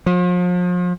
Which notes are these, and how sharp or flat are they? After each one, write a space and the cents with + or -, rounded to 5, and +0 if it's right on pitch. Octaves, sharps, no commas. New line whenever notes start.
F3 +40